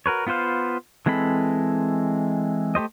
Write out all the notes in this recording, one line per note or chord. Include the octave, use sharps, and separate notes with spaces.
F#4 A#4 B4 C#5
B3 F4 B4 C5 F5
E3 G#3 C4 A4 B5
A3 G4 C5 D#5